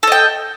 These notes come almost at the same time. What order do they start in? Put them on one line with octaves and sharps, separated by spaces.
A4 D#5 G5